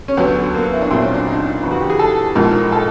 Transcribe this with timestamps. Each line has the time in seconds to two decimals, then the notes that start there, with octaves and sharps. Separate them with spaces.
0.08 C#4
0.17 D2 D3 F#3 B3
0.54 A#3
0.63 B3
0.73 E4
0.81 D4
0.91 A#1 A#2 F#3 C4
1.02 C#4
1.14 D4
1.27 D#4
1.63 E2 C#3 E3
1.71 F#4
1.81 G4
1.90 G#4
1.99 A4
2.35 A#1 G#2 F3 A#4
2.72 A4